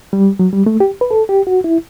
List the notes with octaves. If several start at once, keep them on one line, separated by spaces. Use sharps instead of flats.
G3
F#3
G3
A3
G4
B4
A4
G4
F#4
E4